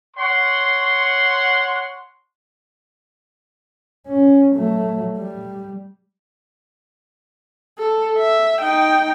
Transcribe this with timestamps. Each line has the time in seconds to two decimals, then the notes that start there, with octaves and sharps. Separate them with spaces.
0.17 C#5 F#5 C6
4.07 C#4
4.55 F#3 A3
5.17 G3
7.78 A4
8.18 E5
8.61 D#4 G5